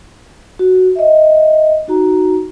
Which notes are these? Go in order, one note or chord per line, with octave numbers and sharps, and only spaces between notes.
F#4
D#5 E5
D#4 F#4 A#5